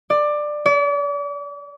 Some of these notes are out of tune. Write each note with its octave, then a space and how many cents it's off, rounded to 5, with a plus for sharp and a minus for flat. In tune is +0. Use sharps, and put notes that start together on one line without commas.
D5 +15
D5 -40